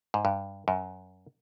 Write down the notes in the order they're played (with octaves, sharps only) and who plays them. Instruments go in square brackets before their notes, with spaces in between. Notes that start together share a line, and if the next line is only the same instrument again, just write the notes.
[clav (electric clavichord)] G#2
G2
F#2